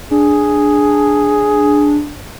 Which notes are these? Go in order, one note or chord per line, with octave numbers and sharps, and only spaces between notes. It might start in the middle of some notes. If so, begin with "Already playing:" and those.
D4 G#4